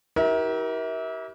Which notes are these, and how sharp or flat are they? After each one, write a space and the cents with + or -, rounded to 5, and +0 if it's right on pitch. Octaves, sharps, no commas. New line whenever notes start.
E4 -30 G4 -35 A#4 +25